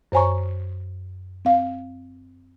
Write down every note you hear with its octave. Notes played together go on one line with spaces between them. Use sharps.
F#2 C5 C#5 G#5 A#5 C#6
C4 F5